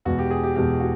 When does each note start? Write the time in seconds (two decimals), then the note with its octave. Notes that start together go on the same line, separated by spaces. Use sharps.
0.05 E2 B2 G#3 F#4
0.19 G4
0.31 G#4
0.43 G4
0.56 E2 B2 G#3 G4
0.80 F#4